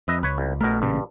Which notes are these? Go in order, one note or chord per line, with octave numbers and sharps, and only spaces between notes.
F2 B4 D#5 E5
C#2 B4 C#5
C2
A#1 B2 A3 A#4
A1 G2 A#2 C#3